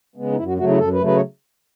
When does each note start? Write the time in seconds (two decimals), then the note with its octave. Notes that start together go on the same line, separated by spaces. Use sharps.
0.16 C#3 G#3 B3
0.32 D#4
0.37 F#2 E4
0.47 F#4
0.57 C#3 F#3 A3 F#4
0.69 E4
0.78 F#2 A4
0.93 B4
1.00 C#3 F#3 A3
1.06 B4
1.16 C#5